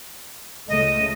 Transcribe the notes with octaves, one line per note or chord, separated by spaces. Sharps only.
C#2 C#3 A3 D#5